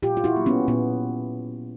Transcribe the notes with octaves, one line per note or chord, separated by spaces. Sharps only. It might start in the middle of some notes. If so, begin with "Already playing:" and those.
A#2 F4 G4
F4
E4 F#4
F#3 A#3
B3 C#4
A#2 B3